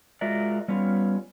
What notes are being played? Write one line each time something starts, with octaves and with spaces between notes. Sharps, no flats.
G#3 F4 F#4 A#4 D5 E5
G3 B3 C#4 F4